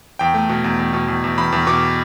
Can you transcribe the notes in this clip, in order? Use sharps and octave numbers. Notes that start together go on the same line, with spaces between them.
E2 G5
A3
B2
E2
E2
B2
E2
E2
E2 B5
E2
B2 D6